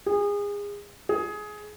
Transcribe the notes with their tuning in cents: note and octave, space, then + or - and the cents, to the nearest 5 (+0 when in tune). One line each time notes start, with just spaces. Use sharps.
G#4 -30
G#4 +15